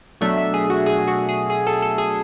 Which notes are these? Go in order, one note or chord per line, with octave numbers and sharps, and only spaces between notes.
B2 F#3 A3 D4 E5
E5
G#4
F#4
G#4
F#4
G#4
G#4
A4
A4
G#4